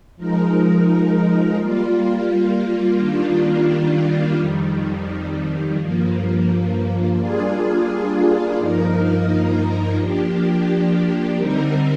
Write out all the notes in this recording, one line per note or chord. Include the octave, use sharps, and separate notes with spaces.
F3 G#3 D#4 A#4
G3 A#3 F4
D#3 G3 A#3 D4 F4
F2 D#3 G3
G2 F3 A#3
G3 A#3 D4 F4 G#4
G2 F3 A#3 D#4 A#4
F3 A#3 D4 G4
D3 G3 C4 D#4 A#4